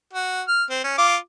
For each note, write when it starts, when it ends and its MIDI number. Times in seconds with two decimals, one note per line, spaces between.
0.13 0.42 66
0.48 0.64 89
0.70 0.80 60
0.84 0.94 61
0.98 1.16 65
0.98 1.16 86